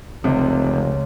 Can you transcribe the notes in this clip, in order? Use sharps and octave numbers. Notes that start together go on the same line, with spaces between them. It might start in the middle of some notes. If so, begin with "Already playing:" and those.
F1 C#2 C3